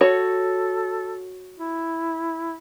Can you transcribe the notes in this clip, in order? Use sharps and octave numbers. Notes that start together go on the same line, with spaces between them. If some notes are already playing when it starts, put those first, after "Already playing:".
F#4 A4 C#5
E4